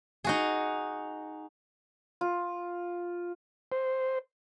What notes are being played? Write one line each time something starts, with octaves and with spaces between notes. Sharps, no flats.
D#4 F#4 G#4
F4
C5